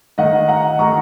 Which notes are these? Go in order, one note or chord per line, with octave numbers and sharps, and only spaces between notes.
D#3 A3 D#4 D#5 F#5
F#5 A#5
D#3 A3 D#4 A#5 C#6